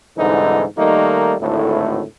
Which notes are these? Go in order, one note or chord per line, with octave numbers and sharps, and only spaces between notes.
C2 G#2 D3 E3 D#4
D#3 G3 A3 A#3 D#4
G#1 D2 A2